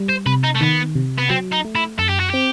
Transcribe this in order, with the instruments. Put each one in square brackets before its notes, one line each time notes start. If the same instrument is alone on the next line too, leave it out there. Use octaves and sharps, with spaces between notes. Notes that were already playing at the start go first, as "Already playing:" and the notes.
Already playing: [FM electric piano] G3
[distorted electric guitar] C5
[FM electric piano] C3 [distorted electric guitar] B4
[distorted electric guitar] D#4
A3
[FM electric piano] D#3 [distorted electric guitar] B3
[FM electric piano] C3
[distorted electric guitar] B3
[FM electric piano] F#3 [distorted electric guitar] C4
[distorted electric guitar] D#4
[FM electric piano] A3
[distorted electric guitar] E4
[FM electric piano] F#2 [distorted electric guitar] A4
[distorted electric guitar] G4
F#4
[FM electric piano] C4 [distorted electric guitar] G4